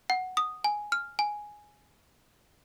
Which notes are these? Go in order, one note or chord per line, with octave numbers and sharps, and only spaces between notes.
F#5
D#6
G#5
F6
G#5